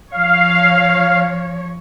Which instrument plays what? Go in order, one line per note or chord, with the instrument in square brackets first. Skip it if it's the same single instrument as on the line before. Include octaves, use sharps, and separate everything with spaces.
[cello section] F3 C#5 [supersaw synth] F5